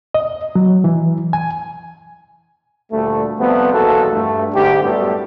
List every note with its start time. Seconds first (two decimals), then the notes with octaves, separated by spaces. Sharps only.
0.14 D#5
0.55 F#3
0.84 E3
1.33 G#5
2.92 D2 A#2 G3 A3
3.38 C3 F3 G3 A3 B3
3.73 B1 E2 F3 A#3 F#4 A4
4.13 G2 A3
4.54 D2 G#2 G4
4.83 F#2 A2 G3 A3 B3